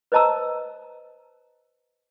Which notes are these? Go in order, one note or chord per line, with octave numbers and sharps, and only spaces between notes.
B4 C5 D#5 A5 A#5 E6